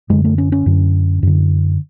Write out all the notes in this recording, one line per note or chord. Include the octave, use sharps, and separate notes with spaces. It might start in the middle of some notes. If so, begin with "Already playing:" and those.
F#2 D3 G#3
A3
C#4
C#4
F#2 D3
F#2 D3